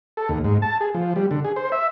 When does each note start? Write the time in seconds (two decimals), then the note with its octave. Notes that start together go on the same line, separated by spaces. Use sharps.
0.17 A4
0.29 D#2
0.44 G#2
0.62 A5
0.81 G#4
0.94 F3
1.16 G3
1.31 D3
1.45 G#4
1.56 C5
1.72 E5